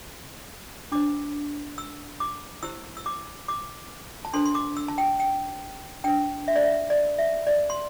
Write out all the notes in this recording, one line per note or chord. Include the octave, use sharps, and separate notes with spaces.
D4 C5 D6
E6
D6
E4 G4 C5 E6
E6
D6
D6
A5
D4 A4 C5 C6
C6
D6
E6
A5
G5
G5
D4 C5 G5
E5
D5
E5
D5
E5
D5
C6